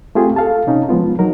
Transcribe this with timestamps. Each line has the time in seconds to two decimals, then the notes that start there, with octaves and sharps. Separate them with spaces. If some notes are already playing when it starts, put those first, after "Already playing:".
0.15 A3 C4 F4 G4 G#4
0.36 A4 F5 A5
0.67 C3 C#4 D#4
0.89 F3 G#3 B3 F4
1.19 F#3 D#4 A#4